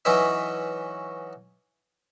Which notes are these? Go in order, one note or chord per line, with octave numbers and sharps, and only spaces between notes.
E3 F#3 C#4 D#4 B4 E5